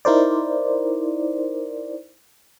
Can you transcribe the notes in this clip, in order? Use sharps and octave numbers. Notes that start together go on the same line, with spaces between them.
D#4 E4 A#4 C5 D5